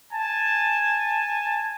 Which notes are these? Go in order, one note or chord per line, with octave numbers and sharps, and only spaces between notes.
G#5 A5